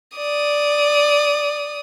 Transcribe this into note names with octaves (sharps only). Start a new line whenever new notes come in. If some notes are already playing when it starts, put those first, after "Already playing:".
D5 D#6